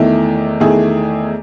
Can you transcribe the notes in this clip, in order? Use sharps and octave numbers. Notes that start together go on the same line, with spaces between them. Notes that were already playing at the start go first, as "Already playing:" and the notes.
Already playing: E2 D#3 A3 E4
E2 D#3 A3 E4 G#4